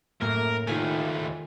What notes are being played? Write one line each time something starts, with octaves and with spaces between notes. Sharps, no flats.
F#2 A2 A#3 A#4
D#2 D#3 A3 F4 G#5